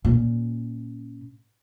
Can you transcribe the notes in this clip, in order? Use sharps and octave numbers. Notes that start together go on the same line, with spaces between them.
A#2 C#4